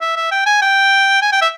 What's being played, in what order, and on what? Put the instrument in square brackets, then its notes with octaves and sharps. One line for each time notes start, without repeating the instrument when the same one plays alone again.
[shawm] E5
E5
G5
G#5
G5
G#5
G5
E5